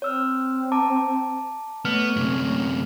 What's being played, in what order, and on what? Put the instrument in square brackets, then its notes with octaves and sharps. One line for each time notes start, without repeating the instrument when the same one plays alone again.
[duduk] C4 [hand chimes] C#5 E6 F6
[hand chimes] A5 A#5 D6
[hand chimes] A3 F6 [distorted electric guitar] B3 [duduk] C#5
[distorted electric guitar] F#2 C3